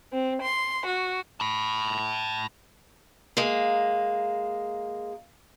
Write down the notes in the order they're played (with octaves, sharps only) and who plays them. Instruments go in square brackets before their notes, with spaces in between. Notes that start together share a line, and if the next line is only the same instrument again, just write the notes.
[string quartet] C4
C6
F#4
[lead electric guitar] A5 B5
[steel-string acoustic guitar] G#3 A#3